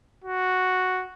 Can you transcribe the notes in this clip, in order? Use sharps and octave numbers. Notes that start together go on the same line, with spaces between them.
F#4